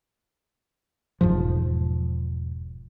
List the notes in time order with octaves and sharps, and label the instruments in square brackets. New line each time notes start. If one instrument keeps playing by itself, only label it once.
[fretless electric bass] E1 G#2 F3